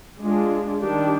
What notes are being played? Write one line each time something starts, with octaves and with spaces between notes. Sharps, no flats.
G#3 D4 F4 G#4
D#3 G3 D4 G4